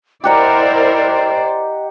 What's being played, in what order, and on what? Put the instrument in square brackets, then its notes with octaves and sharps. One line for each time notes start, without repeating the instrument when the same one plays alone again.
[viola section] E4 A#4 [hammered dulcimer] G4 F#5 A#5 [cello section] C5 D5 [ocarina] D#5